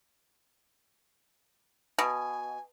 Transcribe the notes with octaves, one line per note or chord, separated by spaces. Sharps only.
B2 G#5